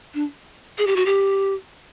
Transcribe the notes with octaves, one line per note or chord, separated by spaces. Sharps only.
D4
G#4
G4
F#4
G4